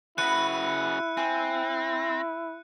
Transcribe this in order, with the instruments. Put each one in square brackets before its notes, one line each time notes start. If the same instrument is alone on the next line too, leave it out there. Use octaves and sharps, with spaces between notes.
[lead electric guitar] C#3 F#4 [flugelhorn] E4 [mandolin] B4 B5 [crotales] F#6 C#7 D#7
[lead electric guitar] C4 [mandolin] G#5 D6